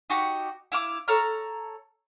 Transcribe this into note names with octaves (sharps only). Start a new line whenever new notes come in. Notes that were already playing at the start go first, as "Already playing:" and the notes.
D#4 F#4 G4
E4 F5 D6
A4 C#5 A#5 F6